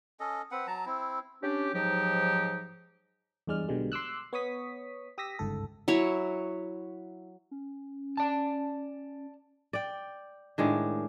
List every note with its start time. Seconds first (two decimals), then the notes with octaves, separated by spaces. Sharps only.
0.20 C#4 A4 D#5
0.51 C4 B4 F#5
0.67 F#3 A5 A#5
0.86 C4 E4
1.43 C#4 D4 G4
1.74 G#2 F3 F#3 D#4 G4
3.47 E2 G2 G#3 D5 F6
3.68 B1 B2 D3 G3 G#3
3.92 C6 D6 E6 F#6
4.33 B3 C#5 C#6 D#6 B6
5.18 G4 D#6 E6 A#6 B6
5.39 G1 C#2 G#2 A4
5.88 F#3 E4 C#5
7.51 C#4
8.17 D5 A5
9.73 D5 G5
10.58 A2 D#3 G#3 D4